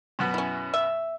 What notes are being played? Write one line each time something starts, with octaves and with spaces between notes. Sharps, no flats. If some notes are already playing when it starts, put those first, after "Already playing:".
F#2 B2 B3
C#4 E4
E5